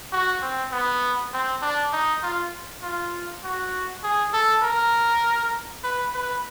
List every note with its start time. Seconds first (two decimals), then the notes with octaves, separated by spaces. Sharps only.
0.12 F#4
0.42 C4
0.72 B3
1.33 C4
1.62 D4
1.92 D#4
2.23 F4
2.82 F4
3.44 F#4
4.04 G#4
4.34 A4
4.63 A#4
5.84 B4
6.14 B4